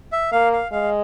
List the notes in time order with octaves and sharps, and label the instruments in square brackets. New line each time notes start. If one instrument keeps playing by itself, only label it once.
[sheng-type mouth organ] E5
[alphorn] A#3 [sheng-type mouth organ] F5
[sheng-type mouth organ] F5
[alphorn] G#3 [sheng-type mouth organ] F5